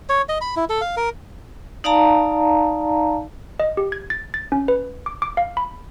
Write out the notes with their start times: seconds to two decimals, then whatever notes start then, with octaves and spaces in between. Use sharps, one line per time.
0.09 C#5
0.29 D#5
0.41 B5
0.56 E4
0.69 A4
0.81 F5
0.97 A#4
1.84 D#4 D5 F5 A5 A#5
3.60 D#5
3.77 G4
3.92 G#6
4.10 A6
4.34 A6
4.52 C#4
4.68 B4
5.06 D6
5.22 D6
5.37 F5
5.57 B5